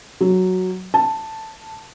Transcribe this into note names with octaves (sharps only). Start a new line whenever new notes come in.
F#3
A5